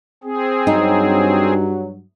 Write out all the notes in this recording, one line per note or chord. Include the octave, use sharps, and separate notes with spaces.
C4 G#4
G2 F#3 D#4